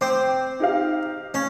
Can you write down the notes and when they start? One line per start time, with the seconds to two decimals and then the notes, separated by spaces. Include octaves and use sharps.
0.01 C4 D6
0.60 D#4 G4 F5
1.34 C#4